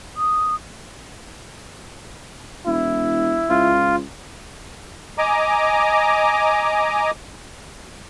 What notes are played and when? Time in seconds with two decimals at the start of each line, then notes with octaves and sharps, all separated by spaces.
0.17 D#6
2.66 E1 E4
3.50 C#2 F4
5.18 D#5 G#5 A#5 D6